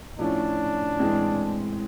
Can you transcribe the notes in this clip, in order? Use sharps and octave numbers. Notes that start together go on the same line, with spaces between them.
A2 F3 A3 C#4 D4 F4
A2 E3 G#3 C4